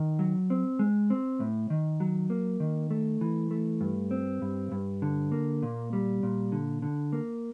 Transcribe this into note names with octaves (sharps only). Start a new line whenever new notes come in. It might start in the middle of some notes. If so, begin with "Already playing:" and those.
Already playing: D#3
F#3
C4
G#3
C4
A2
D#3
F#3
A#3
D#3
A3
E3
A3
G2
C4
G2
G2
D3
A#3
A#2
G3
A#2
D3
D3
A#3